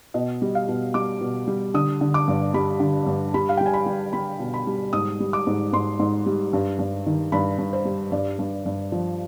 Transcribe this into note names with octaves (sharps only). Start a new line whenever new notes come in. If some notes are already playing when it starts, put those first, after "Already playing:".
B2 D#5
G3
F5
B2
G3 D6
B2
G3
D3 D#6
D3
D6
G2
G3 B5
D3
G2
G3 B5
F5
G5
G3
G#5
B5
G3
G3 B5
B2
B5
G3
G#2 D#6
G3
D6
G#2
G#2 C6
G#2
G3
G2
G2
D#3
G2 B5
G2
C5
G3
G2 D5
G2
G2
F3